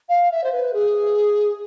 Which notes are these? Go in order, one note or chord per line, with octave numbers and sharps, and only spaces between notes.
F5
E5
C5
B4
G#4